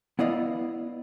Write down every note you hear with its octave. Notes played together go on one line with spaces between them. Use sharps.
B3 E4 D5 D#5 F5